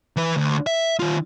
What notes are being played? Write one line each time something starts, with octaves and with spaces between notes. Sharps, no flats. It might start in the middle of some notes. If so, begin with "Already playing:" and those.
E3 B4
D2
E5
D#3 F4